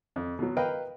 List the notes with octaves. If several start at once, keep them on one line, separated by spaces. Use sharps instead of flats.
F2
B2 F#3
A#4 B4 D#5 F5 G5 B5